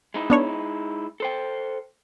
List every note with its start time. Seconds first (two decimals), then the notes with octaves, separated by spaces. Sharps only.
0.14 G#3 D#4 E4
0.30 B3 D4 C#5
1.20 A4 C5 G5